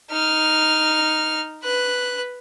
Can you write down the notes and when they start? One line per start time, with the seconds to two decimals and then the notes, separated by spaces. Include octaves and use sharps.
0.11 D#4 F6
1.64 B4 F#6